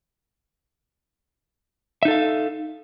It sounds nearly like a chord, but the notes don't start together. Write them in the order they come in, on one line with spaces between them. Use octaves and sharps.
E5 D#4 A4 F5